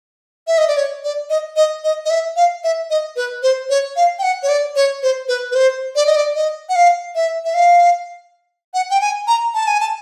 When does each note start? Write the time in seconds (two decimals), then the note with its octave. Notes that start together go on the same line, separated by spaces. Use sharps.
0.47 E5
0.58 D#5
0.68 D5
0.77 C#5
1.04 D5
1.30 D#5
1.56 D#5
1.84 D#5
2.05 D#5
2.10 E5
2.36 F5
2.64 E5
2.90 D#5
3.16 B4
3.43 C5
3.70 C#5
3.96 F5
4.19 G5
4.23 F#5
4.43 C#5
4.49 D5
4.76 C#5
5.03 C5
5.28 B4
5.51 B4
5.55 C5
5.96 D5
6.06 D#5
6.16 D5
6.35 D#5
6.69 F#5
6.76 F5
7.15 E5
7.45 E5
7.54 F5
8.74 F#5
8.90 G5
9.01 G#5
9.27 A#5
9.54 A5
9.67 G#5
9.80 A5